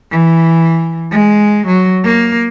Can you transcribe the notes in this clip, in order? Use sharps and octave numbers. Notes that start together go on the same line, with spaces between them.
E3
G#3
F#3
A#3